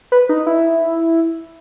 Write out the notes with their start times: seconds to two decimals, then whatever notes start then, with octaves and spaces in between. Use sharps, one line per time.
0.12 B4
0.29 D#4
0.47 E4